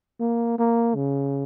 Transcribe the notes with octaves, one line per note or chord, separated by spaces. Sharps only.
A#3
A#3
C#3